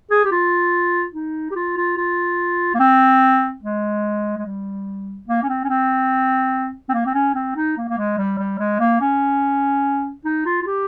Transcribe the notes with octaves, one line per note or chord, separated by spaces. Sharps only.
G#4
G4
F4
D#4
G4
F4
F4
F4
A#3
C4
G#3
G#3
G3
A#3
C#4
C4
C#4
C4
C4
A#3
C4
C#4
C4
D#4
A#3
A#3
G#3
G3
G3
G#3
A#3
C#4
D#4
F4
F4
G4